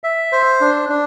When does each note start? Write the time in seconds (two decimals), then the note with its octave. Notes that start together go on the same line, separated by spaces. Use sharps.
0.04 E5
0.32 C5
0.61 D4
0.89 D4